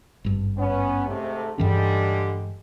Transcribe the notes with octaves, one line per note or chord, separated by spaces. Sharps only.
G#1 G2
B3 C#4
G#2 C3 A3
G2 D3 E3 G3 G#3 C#4